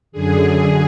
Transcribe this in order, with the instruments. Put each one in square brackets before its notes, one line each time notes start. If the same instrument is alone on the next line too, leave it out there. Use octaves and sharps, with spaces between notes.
[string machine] F#2 D3 G#4